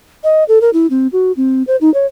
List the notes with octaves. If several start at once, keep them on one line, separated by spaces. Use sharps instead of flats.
D#5
A4
A#4
E4
C4
F#4
C4
C5
D#4
C#5